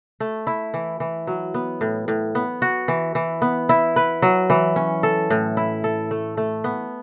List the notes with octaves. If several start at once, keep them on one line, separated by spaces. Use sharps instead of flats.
A3
E4
E3
E3
F#3
B3
A2
A2
B3
F#4
E3
E3
B3
E4
B4
F#3
E3
C#4
A4
A2
E4
A4
A3
A3
B3